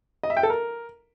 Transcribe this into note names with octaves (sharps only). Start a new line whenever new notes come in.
D#5
E5
G5
A4
A#4